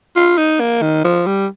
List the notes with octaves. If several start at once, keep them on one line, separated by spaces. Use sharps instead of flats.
F4
D#4
A#3
D#3
F3
G3